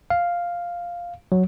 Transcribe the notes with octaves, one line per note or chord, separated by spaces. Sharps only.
F5
F#3